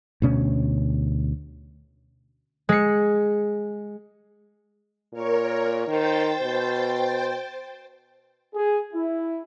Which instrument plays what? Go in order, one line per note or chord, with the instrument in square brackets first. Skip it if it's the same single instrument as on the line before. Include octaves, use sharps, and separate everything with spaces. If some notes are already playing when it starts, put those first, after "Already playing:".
[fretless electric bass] D2 B2 C#4
[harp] G#3 C#7
[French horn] A#2 [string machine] A#4 C#5
[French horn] D#3 [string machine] C5 G5 A6
[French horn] B2
[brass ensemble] G#4
E4